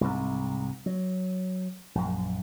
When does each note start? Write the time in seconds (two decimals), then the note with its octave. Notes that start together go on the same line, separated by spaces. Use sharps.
0.01 C2 G#2
0.86 F#3
1.95 A#1 F#2